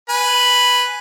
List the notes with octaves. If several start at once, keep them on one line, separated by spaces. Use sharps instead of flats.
B4 G#5 B5